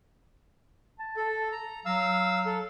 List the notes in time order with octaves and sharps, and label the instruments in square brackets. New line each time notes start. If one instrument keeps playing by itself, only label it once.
[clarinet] A5
[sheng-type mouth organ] A4
A#5
[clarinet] F#3 [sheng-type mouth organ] F5 E6
[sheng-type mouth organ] A4